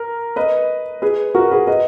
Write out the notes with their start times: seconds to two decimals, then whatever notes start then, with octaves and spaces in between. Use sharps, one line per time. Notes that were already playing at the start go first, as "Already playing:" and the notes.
Already playing: A#4
0.36 B4 D#5
1.02 G#4 B4
1.35 F#4 A#4
1.51 G#4 B4
1.67 B4 D#5